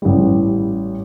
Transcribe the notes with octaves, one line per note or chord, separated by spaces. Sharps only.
A1 G3